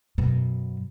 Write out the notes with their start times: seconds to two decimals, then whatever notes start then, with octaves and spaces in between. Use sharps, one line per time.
0.18 F#2 B2